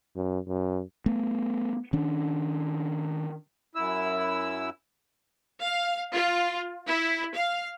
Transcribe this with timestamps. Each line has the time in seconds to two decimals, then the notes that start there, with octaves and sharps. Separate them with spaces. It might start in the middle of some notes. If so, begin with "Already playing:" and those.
0.16 F#2
0.47 F#2
1.06 A3 B3
1.93 D#3 C#4 D4
3.75 F#2 E4 E6
5.62 F5
6.13 F4
6.86 E4
7.33 F5